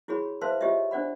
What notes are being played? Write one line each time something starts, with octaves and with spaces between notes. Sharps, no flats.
E4 F#4 G#4 C#5 B5
B4 C5 E5 F5 A5 C6
F4 G4 C#5 D#5 E5
D4 C5 D5 F#5 B5